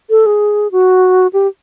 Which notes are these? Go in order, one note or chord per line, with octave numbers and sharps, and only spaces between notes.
A4
G#4
F#4
G4